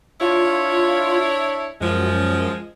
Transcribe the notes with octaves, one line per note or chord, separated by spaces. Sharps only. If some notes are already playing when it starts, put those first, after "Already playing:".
D4 E4 F4 C#5
F#2 F3 G#3